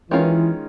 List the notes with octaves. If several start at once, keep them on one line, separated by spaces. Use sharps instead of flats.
D#3 E3 G#3 C#4 F4